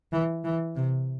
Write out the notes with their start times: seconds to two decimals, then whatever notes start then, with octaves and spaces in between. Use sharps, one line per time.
0.12 E3
0.44 E3
0.76 C3